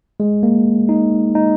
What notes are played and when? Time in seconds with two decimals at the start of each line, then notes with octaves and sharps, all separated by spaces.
0.20 G#3
0.43 A#3
0.89 D#4
1.35 D#4